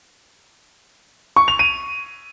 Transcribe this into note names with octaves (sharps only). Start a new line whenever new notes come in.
C#6
F7
D#7